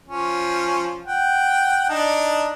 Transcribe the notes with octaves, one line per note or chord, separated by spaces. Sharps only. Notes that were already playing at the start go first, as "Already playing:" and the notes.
F3 C#4
F#5 G5
D4 D#4 A5